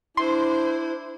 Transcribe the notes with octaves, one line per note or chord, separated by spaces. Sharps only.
D4 E4 C5 C6